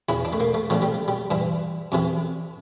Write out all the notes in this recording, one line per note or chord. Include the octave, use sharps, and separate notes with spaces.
E2 E3 E4
D4
A3
A#3
A3
C2 A#2 F3 A3
G3
G3
G2 E3
F2 C3 E3